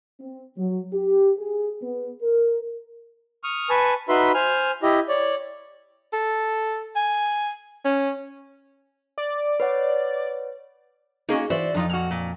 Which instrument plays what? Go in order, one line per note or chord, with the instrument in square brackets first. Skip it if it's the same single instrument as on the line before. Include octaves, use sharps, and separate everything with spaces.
[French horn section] C4
F#3
G4
G#4
B3
A#4
[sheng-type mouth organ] C#6 D#6 F6
B4 G#5 A5 C#6
D#4 F#4 B4 E5 B5 C6
C5 G#5 F6
E4 G4 D#5
C#5 D5
[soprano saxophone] A4
G#5
C#4
[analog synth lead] D5
[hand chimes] B4 C#5 F#5
[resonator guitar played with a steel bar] A#3 C#4 F#4 [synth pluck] D#4 G#4
[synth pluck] E3 [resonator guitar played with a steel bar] F#4 D5 E5 [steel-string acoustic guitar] C5
[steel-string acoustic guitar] F2 [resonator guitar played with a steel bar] D4 D#4 F4
[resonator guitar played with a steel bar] A#2 F#4 [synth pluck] F6
[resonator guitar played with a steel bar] A#2